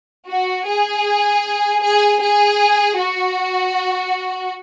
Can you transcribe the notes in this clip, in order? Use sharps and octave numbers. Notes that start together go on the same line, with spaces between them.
F#4
G#4
G#4
G#4
F#4